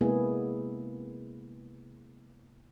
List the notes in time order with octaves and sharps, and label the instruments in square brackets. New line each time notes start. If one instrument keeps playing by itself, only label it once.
[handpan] C3 G#3 A#3 B3 E4 G#4